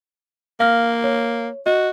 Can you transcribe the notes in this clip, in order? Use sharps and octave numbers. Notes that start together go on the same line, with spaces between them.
A#3 F5 F6
C#5
F#4 D#5